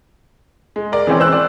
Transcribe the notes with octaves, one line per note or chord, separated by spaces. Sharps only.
G#3
A#4 D5
E3 G#3 C4 C#4 C5 D5
C5 E6 F#6
D5